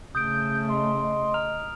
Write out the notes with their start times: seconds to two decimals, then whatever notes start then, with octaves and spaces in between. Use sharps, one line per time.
0.15 C#3 A3 D#6 G6 D7
0.69 D#5 C6
1.34 A#5 F6 F7